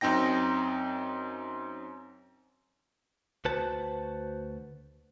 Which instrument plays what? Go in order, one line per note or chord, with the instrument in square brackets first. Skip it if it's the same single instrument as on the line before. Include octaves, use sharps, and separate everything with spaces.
[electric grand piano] F#2 C4 D#4 G5 A#6
[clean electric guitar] D2 F#4 B4 C5 A5